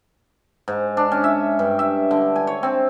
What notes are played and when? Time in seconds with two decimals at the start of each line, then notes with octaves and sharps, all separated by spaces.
0.68 G#2
0.97 D4
1.12 C#4
1.24 E5
1.59 G2
1.79 E5
2.11 D3
2.36 G#5
2.47 C#5
2.63 C4